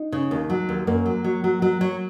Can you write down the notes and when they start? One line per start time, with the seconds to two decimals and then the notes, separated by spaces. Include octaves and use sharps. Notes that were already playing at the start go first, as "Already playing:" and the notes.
Already playing: D#4
0.12 C#3
0.31 D#2
0.50 F#3
0.69 D#2
0.87 F#2 A#3
1.06 F#3
1.24 F#3
1.44 F#3
1.62 F#3
1.81 F#3